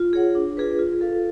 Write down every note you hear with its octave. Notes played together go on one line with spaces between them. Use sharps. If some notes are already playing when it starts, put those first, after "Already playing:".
Already playing: F4
G#4 C#5 F#5
D4
F4 G#4 B4
F4
A4 F5